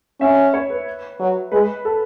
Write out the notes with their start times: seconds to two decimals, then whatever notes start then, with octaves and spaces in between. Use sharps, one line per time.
0.21 C#4 E5
0.54 C#5
0.70 B4
1.20 F#3
1.52 G#3 B4
1.85 A4